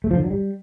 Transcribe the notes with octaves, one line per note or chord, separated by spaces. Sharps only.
A3
F3
D3
F#3
G3